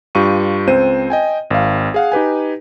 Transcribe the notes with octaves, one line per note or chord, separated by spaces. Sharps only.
G2 F4 G4 C#6 D#7
C#2 C4 C5 D#7
D#5 G5 G#5
G#1 F5
G#4 F5 F#5
D#4 G4 B4 G#5